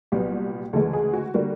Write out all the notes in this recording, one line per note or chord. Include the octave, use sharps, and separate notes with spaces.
C2 A#2 F#3 B3 G4
D2 C#3 E3 G#3 A4
G#4
F#4
D3 G3 A#3 F#4